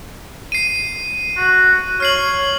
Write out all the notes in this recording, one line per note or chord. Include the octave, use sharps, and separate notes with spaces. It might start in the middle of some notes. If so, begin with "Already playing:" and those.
C7 D#7
F#4
C#5 F6 C7 F#7